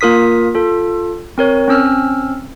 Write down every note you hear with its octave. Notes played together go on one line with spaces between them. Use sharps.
A#3 F4 A#4 D#6 B6
F4 A4
C4 A#4 C#5
C4 C#4 E6 F6